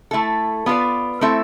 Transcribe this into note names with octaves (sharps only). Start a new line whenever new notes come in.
A3 E4 A4
B3 F4 B4 D5
A3 C4 E4 A4 E5